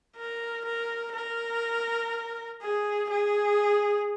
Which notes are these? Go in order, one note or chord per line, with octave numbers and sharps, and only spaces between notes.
A#4
A#4
A#4
G#4
G#4